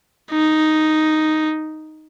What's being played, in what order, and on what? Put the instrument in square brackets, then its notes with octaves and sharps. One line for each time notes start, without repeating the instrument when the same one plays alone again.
[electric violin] D#4